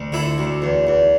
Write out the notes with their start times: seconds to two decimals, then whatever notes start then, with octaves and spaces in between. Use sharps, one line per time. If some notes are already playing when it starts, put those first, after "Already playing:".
Already playing: D2
0.12 D3 E4
0.38 D2
0.62 E2
0.87 E2